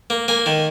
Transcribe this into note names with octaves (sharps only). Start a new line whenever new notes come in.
A#3
A#3 G#5
D#3